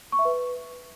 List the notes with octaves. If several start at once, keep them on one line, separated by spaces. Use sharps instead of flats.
C#6
E5
B4